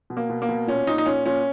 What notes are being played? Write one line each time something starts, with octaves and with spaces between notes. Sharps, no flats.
B2
A#3
B2
A#3
B2
A#2 C#4
A#2 D#4
D#4
A#2 C#4
A#2 C#4